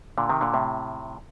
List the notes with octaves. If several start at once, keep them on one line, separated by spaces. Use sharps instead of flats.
A#2 D3
C3 D#3
A#2 D3
A2 C3